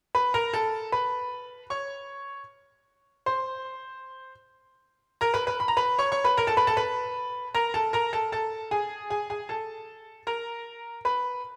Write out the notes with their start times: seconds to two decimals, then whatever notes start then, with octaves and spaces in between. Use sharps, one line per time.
0.15 B4 B5
0.34 A#4 A#5
0.54 A4 A5
0.92 B4 B5
1.70 C#5 C#6
3.26 C5 C6
5.21 A#4 A#5
5.34 B4 B5
5.47 B4 B5
5.60 B5
5.68 A#5
5.77 B4 B5
5.99 C#5 C#6
6.12 C#5 C#6
6.24 B4 B5
6.37 A#4 A#5
6.47 A4 A5
6.57 B4 B5
6.67 A4 A5
6.77 B4 B5
7.55 A#4 A#5
7.74 A4 A5
7.93 A#4 A#5
8.13 A4 A5
8.32 A4 A5
8.71 G#4 G#5
9.10 G#4 G#5
9.30 G#4 G#5
9.49 A4 A5
10.27 A#4 A#5
11.05 B4 B5